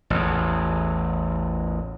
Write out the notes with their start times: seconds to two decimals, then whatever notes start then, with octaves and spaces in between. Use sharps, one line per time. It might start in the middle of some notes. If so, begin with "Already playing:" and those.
0.10 A1 E2